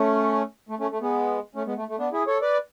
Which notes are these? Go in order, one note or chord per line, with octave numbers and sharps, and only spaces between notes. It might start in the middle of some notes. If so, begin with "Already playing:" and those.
Already playing: A3 C#4
A3
A3 C#4
A3
G#3 B3
A3 C#4
G#3 B3
A3
A3
B3 D4
E4 G#4
A4 C#5
B4 D5